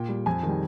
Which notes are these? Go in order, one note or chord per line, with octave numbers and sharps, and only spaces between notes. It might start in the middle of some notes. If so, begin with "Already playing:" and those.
Already playing: A#2 G5
G3
F2 G#5
D#3 G3